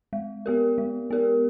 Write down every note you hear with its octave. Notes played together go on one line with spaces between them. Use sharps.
G#3
B3 G4 A#4
G#3
B3 G4 A#4